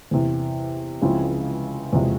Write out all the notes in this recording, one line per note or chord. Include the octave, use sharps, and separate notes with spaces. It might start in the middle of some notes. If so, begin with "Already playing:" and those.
E2 C3 E3
C#2 C#3 F3 C4 E4
E1 E2 C3 F3 G#3